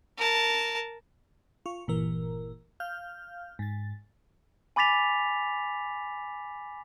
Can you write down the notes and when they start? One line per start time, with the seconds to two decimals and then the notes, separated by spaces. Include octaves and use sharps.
0.18 A#4 A5
1.66 F4 C#6
1.87 G1 A#2 E3 A#4
2.80 F5 F6 G6
3.59 G#2 A6
4.76 G#5 B5 D6 A6 B6 F7